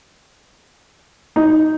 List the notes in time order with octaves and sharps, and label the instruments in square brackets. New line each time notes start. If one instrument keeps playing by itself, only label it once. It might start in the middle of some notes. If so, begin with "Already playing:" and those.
[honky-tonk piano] D#4